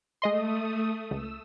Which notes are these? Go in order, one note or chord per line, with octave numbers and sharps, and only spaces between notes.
G#3 A3 D#5 C6 D#6
C#2 E6